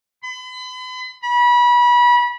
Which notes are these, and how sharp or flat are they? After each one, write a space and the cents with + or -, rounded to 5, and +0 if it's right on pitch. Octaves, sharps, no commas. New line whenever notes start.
B5 +40
B5 -30